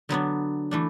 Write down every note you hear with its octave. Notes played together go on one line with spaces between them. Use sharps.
D3 F#3 B3 D4
E3 A3 D4